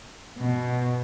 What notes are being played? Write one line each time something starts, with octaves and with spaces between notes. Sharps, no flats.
B2